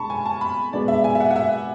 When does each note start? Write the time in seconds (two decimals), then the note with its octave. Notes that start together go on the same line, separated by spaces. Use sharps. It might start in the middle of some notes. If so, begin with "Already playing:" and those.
Already playing: B2 G#3 D4 A5 B5 C#6
0.10 G#5
0.26 A5
0.41 B5
0.73 B2 G#3 B3 D4 D5
0.88 E5
1.04 G#5
1.15 E5
1.20 F#5
1.30 F#5
1.36 E5